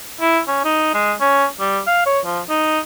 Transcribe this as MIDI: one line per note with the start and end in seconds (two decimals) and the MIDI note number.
0.21 0.39 64
0.48 0.62 61
0.64 0.91 63
0.94 1.13 56
1.21 1.45 61
1.60 1.80 55
1.87 2.05 77
2.06 2.20 73
2.25 2.41 53
2.49 2.79 63